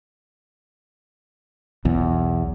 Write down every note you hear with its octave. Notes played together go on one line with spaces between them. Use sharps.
B1 E2